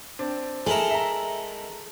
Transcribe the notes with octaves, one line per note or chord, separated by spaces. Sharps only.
C4 D4
G#3 E4 A4 A#4
E5 A#5